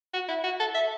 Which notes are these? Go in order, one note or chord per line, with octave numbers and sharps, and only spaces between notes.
F#4
E4
F#4
A4
E5